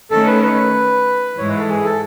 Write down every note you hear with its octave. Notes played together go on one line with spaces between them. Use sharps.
D#3 A3 C#4 A4
B4
B4
G#2 E3 G#3 C#5
B4
A4
G#4
A4